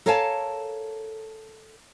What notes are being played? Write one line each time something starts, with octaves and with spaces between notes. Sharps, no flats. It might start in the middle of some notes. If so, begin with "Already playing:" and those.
A4 A#4 C#5 F5 G#5 A5